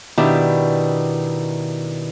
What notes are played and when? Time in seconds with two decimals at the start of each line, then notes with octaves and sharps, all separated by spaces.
0.17 B2 D#3 D4 E4 G4